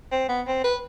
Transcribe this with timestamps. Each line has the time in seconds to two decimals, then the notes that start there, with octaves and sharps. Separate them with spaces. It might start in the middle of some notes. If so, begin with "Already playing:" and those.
0.12 C4
0.29 B3
0.48 C4
0.64 B4